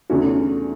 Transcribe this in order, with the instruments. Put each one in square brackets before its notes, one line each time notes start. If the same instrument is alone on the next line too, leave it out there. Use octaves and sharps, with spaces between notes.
[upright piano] E2 D3 A3 C#4 F#4